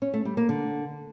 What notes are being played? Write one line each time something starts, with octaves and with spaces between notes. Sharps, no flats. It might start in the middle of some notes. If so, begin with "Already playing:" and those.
C#4
A3
G3
A#3
D3